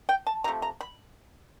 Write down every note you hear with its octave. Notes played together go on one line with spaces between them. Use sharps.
G5
A5
C3 F3 A3 A#5
A#5
B5